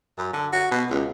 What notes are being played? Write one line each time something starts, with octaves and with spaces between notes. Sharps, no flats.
F#2
D3
F#4
B2
C#2